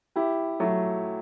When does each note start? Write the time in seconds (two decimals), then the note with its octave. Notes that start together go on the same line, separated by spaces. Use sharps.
0.16 E4 G4
0.60 F#3 A3